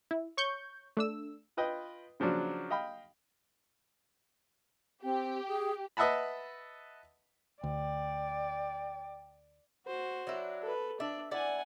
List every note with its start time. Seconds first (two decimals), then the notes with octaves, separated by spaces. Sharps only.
0.11 E4
0.37 C#5 C#6 G6
0.97 A3 D4 E6
1.57 F4 B4 D#5 G5 D#6
2.20 C#3 F3 F#3 D4 F#4
2.70 D#5 F5 G5 B5
5.03 C4 G4
5.48 G#4
5.97 B4 D#5 E5 F#5 A5 B5
7.64 D2 D5 G5
9.86 F#4 C5
10.27 F#3 D4 E4
10.62 A4 B4
11.00 D4 D5 E5
11.31 E4 D5 F#5 G#5